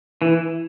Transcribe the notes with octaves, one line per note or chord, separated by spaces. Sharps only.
E3